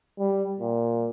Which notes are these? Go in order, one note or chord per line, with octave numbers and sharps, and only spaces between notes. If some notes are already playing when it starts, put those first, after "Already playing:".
G3
A#2